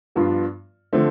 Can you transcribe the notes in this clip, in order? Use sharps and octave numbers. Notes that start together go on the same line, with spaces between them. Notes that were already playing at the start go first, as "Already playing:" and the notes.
G2 F3 B3 D4 F4
D3 F3 A3 C4